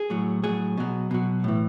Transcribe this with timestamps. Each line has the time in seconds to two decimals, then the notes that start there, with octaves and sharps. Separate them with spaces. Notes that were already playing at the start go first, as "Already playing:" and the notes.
Already playing: G#4
0.10 A2 F#3
0.43 A2 F#3 G#4
0.77 B2 F#3
1.11 B2 F#3
1.44 A2 E3